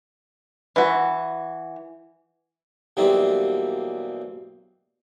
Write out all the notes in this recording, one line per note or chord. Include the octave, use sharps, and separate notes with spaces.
E3 F#4
B1 E3 G3 A#3 C4